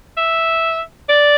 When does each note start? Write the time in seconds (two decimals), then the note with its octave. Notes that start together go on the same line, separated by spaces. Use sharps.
0.17 E5
1.09 D5